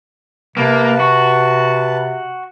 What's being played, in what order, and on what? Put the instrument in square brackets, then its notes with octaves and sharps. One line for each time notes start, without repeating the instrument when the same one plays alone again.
[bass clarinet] C3 [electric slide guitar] A#3 [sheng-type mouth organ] B4 A5
[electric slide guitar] F#4